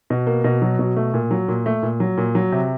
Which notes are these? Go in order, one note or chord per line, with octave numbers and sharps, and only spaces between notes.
B2
A#3
B2
F#3
B2
A3
A#2
F#3
A#2
A3
A#2
F#3
A#2
F#3
C3